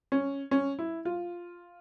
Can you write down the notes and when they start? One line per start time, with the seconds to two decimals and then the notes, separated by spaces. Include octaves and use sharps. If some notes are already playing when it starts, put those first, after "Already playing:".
0.12 C#4
0.51 C#4
0.79 E4
1.05 F4